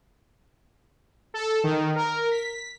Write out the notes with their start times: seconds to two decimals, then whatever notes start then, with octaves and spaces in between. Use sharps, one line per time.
1.34 A4
1.64 D#3
1.96 A#4
2.31 B6